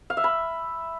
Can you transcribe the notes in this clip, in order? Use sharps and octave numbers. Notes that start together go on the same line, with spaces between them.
F5
E5
B5